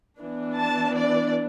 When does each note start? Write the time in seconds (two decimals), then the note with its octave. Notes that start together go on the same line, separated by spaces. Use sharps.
0.18 E3 B3 D4
0.56 A5
0.95 D5